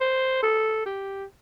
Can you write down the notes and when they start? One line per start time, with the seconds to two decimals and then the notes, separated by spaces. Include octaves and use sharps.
0.01 C5
0.43 A4
0.86 G4